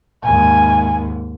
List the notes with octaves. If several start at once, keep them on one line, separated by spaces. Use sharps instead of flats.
D#2 G#2 G#5